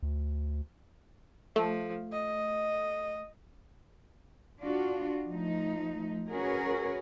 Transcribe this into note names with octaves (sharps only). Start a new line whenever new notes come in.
D2
F3 A3
D#5
D4 F4 F#4
F3 A3 D#4
C#4 F#4 G#4 A#4 B4 C#5